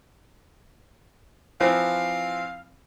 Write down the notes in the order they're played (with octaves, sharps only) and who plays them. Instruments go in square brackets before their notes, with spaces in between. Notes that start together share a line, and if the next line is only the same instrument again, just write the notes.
[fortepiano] E3 F3 C4 [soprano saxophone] F5